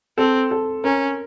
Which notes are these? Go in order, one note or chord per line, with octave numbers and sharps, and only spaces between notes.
C4 A4
A4
C#4 A#4